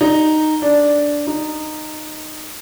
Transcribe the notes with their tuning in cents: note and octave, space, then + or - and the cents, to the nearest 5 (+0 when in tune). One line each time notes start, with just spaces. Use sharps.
D#4 -5
D4 -5
D#4 -15